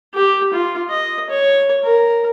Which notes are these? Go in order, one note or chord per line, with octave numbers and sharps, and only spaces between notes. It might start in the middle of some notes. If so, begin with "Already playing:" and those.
G4
F4
D#5
C#5
A#4